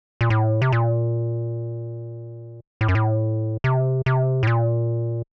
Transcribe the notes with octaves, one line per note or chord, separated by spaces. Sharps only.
A#2
A2
C3
A#2
A2
F#2
A2
C3
C3
A2
A#2